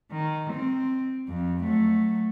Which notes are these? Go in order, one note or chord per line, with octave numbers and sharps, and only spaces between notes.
D#3
C4
F2
F#3 A3